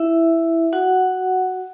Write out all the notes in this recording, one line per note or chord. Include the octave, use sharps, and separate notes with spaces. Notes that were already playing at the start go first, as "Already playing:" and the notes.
Already playing: E4 E5
F#4 F#5